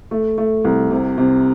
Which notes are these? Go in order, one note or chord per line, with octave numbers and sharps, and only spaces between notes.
A3
A3
C2
C3
C3